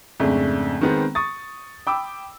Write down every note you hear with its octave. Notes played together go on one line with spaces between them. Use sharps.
F2 G#2 C#3 A3 D4
D#3 G#3 B3 C4
C#6 D#6 A6
G5 B5 D6 E6